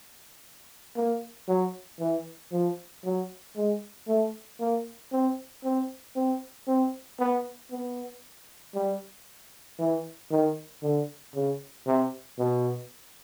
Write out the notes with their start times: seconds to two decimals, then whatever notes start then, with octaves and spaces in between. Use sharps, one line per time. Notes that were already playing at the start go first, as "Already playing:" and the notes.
0.96 A#3
1.48 F#3
2.00 E3
2.52 F3
3.04 F#3
3.56 G#3
4.08 A3
4.60 A#3
5.12 C4
5.64 C4
6.16 C4
6.68 C4
7.19 B3
7.71 B3
8.75 G3
9.79 E3
10.31 D#3
10.83 D3
11.35 C#3
11.87 C3
12.39 B2